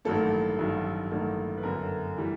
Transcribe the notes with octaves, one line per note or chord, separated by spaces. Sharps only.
A1 G2 D#3 F#3 A#3 A4
A1 G2 D#3 F#3
A1 G2 D#3 F#3 A#3 A4
B4
G1 F#2 D3 A#4
E3 G3